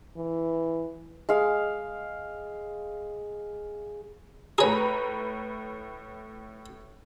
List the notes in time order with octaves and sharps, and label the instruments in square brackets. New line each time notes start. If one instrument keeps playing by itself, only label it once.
[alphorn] E3
[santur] G#3 F5
[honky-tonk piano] A2 B4 A#5 [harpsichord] G#4 C#5